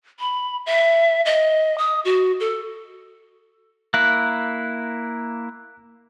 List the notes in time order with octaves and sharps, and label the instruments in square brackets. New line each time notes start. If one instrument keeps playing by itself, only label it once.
[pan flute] B5
E5
D#5
D#6
F#4
A4
[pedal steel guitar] A#3 E4 [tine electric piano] F#6